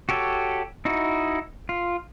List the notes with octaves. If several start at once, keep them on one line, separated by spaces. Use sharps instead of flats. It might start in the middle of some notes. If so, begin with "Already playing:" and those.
F#4 G4 A4 C#5
D#4 E4 F#4
F4